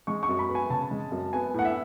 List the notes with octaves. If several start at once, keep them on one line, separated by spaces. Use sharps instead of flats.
G#3 C#6
C#6
F#2
B5
B3
G#5
C#3 A5
G#3
F#2
B3 G#5
A2 F#5
E5